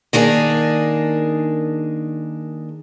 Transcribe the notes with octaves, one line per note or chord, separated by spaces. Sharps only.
D#3 A#3 D4 G#4